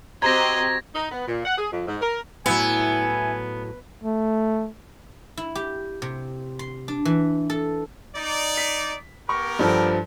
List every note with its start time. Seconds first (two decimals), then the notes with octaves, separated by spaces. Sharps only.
0.22 C4 F#4 G4 C5 D#5 A#5 G#6 A#6
0.95 D#4
1.12 B3
1.28 A#2
1.46 F#5
1.58 G#4
1.72 F2
1.87 G#2
2.02 A#4
2.46 A2 F#3 B3 E4 G#5
4.03 A3
5.37 E4
5.55 G4
6.02 C3
6.59 C6
6.88 D4
7.05 E3
7.50 A4
8.15 D#4 D5
8.57 B6
9.29 B3 G4 A#4 C#6
9.59 G2 F3 A4